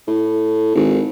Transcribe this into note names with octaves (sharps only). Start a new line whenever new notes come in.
A2
G#1